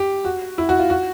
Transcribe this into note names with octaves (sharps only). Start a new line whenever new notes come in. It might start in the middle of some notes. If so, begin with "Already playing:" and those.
Already playing: G4
F#4
E4
F#4
F4
F#4